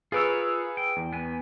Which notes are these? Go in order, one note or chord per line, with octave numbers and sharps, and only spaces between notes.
F4 G#4 A#4 B4 C#5 E6
G5
E2
B3 G#5